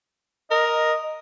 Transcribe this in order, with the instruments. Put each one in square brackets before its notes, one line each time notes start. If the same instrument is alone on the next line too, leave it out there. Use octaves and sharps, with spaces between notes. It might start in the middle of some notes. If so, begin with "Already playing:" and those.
[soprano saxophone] A#4 [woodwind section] D#5